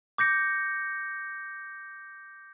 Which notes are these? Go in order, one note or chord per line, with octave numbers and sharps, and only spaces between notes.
D6 G6 A#6 C#7